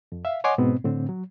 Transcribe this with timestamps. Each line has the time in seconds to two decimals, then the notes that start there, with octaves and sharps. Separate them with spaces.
0.12 F2
0.25 E5 F5
0.44 C#5 D#5 F#5 G#5 C6 D6
0.58 G#2 B2 B3 C4
0.84 A2 D3 C4
1.09 F#3